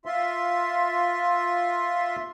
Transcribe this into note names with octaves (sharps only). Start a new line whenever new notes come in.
F4 E5 C6